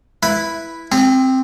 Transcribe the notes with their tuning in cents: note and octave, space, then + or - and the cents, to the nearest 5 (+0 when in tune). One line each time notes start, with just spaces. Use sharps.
E4 +0 B4 +0
C4 +0 G#4 -45